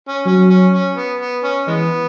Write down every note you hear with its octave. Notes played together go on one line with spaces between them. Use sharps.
C#4
F#3 C#4
C#4
C#4
B3
B3
C#4
E3 G#3 B3